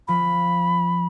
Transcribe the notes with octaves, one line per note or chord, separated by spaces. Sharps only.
F3 B5